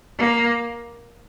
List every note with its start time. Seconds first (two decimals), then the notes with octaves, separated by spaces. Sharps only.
0.18 A#3